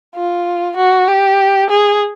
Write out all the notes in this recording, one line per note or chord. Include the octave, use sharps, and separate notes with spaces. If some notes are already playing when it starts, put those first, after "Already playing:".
F4
F#4
G4
G#4